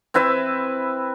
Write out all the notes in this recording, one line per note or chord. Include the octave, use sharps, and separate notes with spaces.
C4 E4 B4 E5